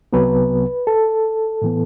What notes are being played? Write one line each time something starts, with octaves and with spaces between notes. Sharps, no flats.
C2 C3 F#3 B3 B4
A4
A2 E3 B3